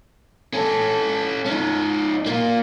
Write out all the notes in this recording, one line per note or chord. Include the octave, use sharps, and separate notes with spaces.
C#4 A4
C#4 D#4
A#3 F4